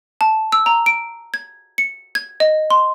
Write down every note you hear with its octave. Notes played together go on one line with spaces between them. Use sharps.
A5
E6
A#5
D7
G#6
C#7
G#6
D#5
C6